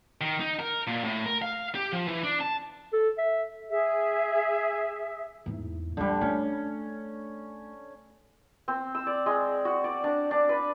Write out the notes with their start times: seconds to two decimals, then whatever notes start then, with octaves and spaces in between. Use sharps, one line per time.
0.21 D#3
0.40 D#4
0.60 A#4
0.87 A#2
1.04 A2
1.26 A#4
1.42 F5
1.75 G4
1.93 F3
2.08 E3
2.24 D4
2.40 A5
2.93 A4
3.18 E5
3.69 G#4 E5
5.46 E2 G#2
5.97 D3 F3 G3 G#3
6.21 A3 C#4 D4
8.68 C4
8.95 E6
9.07 D5
9.26 G#3
9.65 F#4
9.84 D5
10.04 D4
10.31 D4
10.49 B4